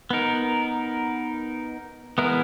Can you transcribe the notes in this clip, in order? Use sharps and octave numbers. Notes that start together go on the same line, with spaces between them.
B3 D#4 A#4
E3 G#3 B3 E4 A#4